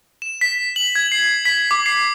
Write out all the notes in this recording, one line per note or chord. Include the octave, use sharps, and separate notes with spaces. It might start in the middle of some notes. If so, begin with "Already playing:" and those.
E7
B6
F#7
G#6
C7
B6
D6
C7